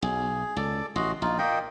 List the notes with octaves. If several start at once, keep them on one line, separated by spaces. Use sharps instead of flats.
B1 G#4
C#2 A4 D5 D6
A1 F#4 D#5 C6
A#1 D#4 F4
A#2 A#3 D#5 G5